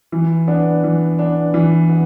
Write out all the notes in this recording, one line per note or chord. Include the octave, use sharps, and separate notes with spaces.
E3
B3 D4
E3
B3 D4
E3
B3